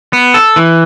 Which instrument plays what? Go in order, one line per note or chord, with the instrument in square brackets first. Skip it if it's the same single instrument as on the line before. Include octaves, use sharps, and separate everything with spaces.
[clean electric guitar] B3
A4
E3